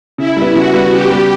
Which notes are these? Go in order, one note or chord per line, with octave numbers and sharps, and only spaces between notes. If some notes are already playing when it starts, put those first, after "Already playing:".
C#3 E4
G3 B3
C#3 F#4
G3 B3
C#3 G4
G3 B3